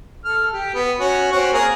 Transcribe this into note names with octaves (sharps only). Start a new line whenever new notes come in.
A4 F6
G4
B3
C#4 F#4
C4 C#4 F#4
A#3 G#4 A#4